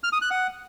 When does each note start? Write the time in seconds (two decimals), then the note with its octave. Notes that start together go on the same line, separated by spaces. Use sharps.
0.03 F6
0.13 D#6
0.22 F#6
0.31 F#5